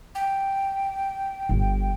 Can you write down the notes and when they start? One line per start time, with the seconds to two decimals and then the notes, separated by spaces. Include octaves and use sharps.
0.15 G5
1.49 G1